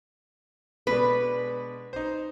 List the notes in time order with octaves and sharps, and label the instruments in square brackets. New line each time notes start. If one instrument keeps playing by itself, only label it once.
[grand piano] B2 G#3 D4 [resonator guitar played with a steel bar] B4
[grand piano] D#4 C5